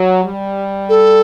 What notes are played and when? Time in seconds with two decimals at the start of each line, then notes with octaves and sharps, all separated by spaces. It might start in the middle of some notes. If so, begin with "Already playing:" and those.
Already playing: F#3
0.24 G3
0.89 A4